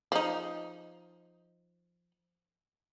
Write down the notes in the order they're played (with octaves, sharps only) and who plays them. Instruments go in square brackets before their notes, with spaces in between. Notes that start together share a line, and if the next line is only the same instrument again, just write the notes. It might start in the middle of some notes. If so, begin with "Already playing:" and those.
[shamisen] F3 D#4